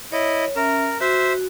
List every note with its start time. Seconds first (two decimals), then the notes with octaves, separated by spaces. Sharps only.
0.12 E4 C#5 D#5
0.56 C#4 A#4 E5
1.01 F#4 C5 E5